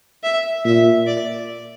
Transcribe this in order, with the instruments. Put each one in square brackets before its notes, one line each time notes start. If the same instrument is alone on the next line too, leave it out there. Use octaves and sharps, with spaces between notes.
[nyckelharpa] E5
[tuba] A#2 [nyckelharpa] E5
[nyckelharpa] D5